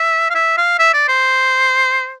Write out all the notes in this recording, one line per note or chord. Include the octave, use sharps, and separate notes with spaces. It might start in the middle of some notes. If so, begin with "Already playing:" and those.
Already playing: E5
F5
E5
F5
E5
D5
C5